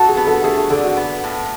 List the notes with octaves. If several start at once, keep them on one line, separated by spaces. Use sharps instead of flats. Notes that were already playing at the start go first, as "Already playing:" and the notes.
Already playing: F#4 A4
G#4
B3
A4
A3 G#4
F#4
D3 A4
F#4
B3
A2